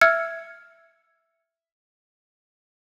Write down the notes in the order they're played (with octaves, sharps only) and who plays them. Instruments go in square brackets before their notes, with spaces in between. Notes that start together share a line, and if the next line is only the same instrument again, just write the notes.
[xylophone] E5 E6 F6 G#6 C#7